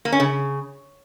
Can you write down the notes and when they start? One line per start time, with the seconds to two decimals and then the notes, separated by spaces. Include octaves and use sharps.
0.05 A#3
0.12 C#4
0.20 C#3